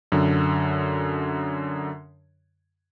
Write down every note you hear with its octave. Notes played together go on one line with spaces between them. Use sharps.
F#2 D3